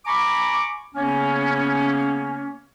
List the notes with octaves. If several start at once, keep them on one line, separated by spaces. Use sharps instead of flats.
G#5 A#5 B5 C#6 D6
C#3 A#3 B3 C#4